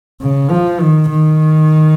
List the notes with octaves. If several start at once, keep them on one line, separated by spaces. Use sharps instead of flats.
C#3
F3
D#3
D#3